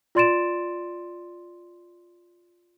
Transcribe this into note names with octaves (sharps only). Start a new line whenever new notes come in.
F4 D5 C6 A6 D7 E7